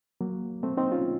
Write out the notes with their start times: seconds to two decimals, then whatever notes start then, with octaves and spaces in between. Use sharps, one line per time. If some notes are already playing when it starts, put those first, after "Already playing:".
0.21 F#3 A#3
0.63 A3 C4
0.77 C4 D#4
0.92 C#4 F4